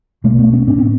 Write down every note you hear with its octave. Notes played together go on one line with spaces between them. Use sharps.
B2 G#3 A#3
A3 B3
B3 C#4
A2 C4 D4
B3 C#4